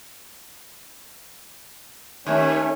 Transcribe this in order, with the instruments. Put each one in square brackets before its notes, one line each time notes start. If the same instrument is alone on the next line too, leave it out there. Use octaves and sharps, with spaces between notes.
[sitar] D#2 [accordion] A3 C#4 C#5